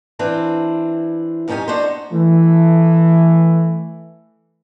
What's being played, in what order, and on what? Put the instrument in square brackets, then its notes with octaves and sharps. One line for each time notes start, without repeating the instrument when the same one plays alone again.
[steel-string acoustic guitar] E3 C4 D4
F#2 C3 C#4 D#4 G4 G#5
D4 D#4 F#4 A4 C5
[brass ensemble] E3 A3